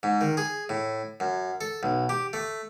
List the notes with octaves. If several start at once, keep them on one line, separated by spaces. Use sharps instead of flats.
G#2
D#3
G#4
A2
F#2
A4
B1
G4
A3